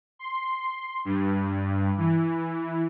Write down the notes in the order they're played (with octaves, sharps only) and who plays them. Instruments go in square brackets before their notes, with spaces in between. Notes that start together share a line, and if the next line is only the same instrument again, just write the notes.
[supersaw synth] C6
G2
E3